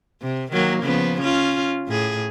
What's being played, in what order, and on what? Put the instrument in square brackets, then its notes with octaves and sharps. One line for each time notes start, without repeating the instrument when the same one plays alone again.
[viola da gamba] C3
D#3 F#3 A#3
C#3 F3 B3
C#4 F4
A2 G#4